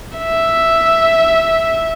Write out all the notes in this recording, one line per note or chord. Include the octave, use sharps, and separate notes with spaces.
E5